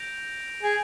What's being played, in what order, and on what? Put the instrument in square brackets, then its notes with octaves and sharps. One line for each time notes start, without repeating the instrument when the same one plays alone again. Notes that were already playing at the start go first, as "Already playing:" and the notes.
Already playing: [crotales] G6 A#6 D7 F7
[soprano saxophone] G#4